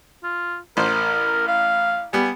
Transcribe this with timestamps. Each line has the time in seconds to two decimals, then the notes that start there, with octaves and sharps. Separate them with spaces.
0.23 F4
0.77 A1 A#4 C5
1.48 F5
2.13 G3 B3 G#5